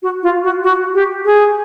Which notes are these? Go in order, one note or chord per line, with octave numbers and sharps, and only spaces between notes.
F#4
F4
F#4
F#4
G4
G#4